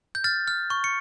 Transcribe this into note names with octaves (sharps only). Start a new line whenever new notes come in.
G6
F6 A6
F6
C#6
C#7